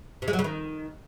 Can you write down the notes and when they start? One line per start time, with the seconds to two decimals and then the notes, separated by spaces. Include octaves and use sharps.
0.22 C3
0.28 G#3
0.33 F#3
0.39 C#3
0.44 D#3